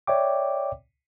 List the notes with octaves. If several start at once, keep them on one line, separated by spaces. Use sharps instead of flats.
C#5 D5 E5 G5 D6